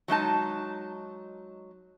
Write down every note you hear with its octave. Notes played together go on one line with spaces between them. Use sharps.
F#3 G#3 D#4 A5